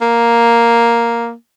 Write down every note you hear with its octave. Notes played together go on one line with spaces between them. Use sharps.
A#3